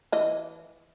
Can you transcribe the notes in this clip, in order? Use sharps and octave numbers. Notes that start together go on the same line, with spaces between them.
E3 D#5